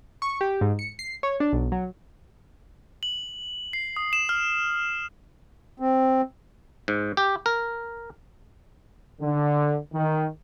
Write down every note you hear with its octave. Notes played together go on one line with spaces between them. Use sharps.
C#6
G4
G#2
C#7
C7
C#5
D4
B1
F#3
F#7
C7
D#6
E7
F6
C4
G#2
G4
A#4
D3
D#3